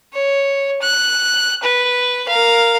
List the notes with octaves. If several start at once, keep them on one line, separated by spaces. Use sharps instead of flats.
C#5
F#6
B4
A#4 F5